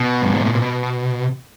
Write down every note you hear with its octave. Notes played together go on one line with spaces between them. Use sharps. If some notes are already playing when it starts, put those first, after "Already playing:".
Already playing: B2
G2
G#2
A2
A#2
B2